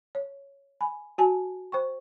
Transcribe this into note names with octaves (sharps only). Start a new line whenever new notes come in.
C#5
G#5 B5
F#4 G#5 A5
C5 G5 C#6